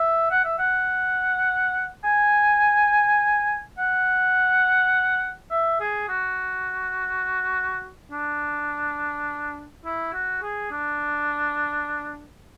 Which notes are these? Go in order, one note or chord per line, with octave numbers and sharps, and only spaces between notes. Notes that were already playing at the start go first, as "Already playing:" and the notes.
Already playing: E5
F#5
E5
F#5
G#5
F#5
E5
G#4
F#4
D4
E4
F#4
G#4
D4